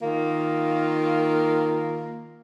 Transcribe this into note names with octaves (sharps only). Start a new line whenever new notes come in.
D#3 A#3 F4